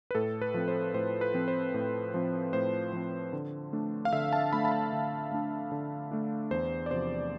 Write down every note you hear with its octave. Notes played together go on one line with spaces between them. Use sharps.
B4
A2 A4
B4
F3 C4
C5
A2 C5
B4
F3 C4
C5
A2
F3 C4
A2 C5
F3 C4
D3
A3 D4
F5
D3 E5
A5
A3 D4 B5
A5
B5
D3
A3 D4
D3
A3 D4
E2 C5
D5
C3 F3 C5